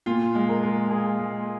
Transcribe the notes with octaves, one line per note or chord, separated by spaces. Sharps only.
A#2 F4
G#3
A#4
G#3
G#3 G#4
G#3